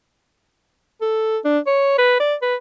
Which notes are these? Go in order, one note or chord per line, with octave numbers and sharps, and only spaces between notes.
A4
D4
C#5
B4
D5
B4